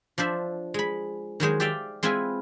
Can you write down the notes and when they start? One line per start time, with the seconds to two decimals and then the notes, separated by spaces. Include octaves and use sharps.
0.18 F3 D4 C5 E5
0.74 G#3 B5
1.40 D#3 F#3 G#3 C5
1.60 G4 D5 E5 F5 G5
2.03 G#3 C4 E4 F4 B4 G#5